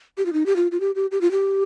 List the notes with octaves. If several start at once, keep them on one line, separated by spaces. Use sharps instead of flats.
G4
F4
D#4
G4
F4
F4
G4
G4
G4
F4
G4